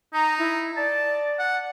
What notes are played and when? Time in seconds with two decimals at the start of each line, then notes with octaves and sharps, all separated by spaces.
0.14 D#4 A#5
0.39 E4
0.77 D5 A5
1.39 F#5